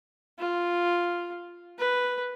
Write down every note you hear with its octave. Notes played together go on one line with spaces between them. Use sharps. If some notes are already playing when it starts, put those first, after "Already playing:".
F4
B4